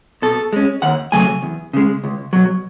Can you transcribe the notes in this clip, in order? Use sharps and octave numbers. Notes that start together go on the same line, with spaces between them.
B2 A4
G#3 C#4
D#2 F#5
C#3 F#3 A3 G#5
E2
C#3 G#3
C#2
B2 F#3